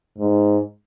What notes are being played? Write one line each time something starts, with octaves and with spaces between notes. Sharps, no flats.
G#2